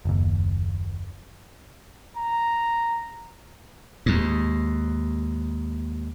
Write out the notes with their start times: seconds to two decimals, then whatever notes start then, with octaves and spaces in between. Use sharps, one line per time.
0.05 F#1 D#2
2.17 A#5
4.06 D#2 G#2